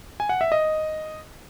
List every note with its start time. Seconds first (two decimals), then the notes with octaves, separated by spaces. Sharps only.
0.20 G#5
0.29 F#5
0.41 E5
0.52 D#5